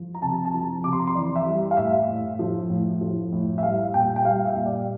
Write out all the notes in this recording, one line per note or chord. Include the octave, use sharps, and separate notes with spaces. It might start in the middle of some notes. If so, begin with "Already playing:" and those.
Already playing: F3
A#5
C3 A5
A5
F3 A#5
C3 D6
C6
A#5
C6
E3 D5
E5
G3
F5
A2 E5
A2
F3
A2
F3
A2
E5
G3 F5
A#2 G5
G5
G3 F5
E5
A#2
D5